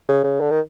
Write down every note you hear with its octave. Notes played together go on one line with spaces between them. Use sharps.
C#3
C#3
D3
D#3